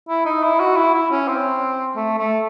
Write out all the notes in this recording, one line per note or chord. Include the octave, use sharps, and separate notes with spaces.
E4
D#4
E4
F#4
E4
E4
C#4
C4
A3
A3